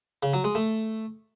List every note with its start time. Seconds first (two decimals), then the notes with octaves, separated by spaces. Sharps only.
0.23 C#3
0.33 F#3
0.44 G#3
0.55 A3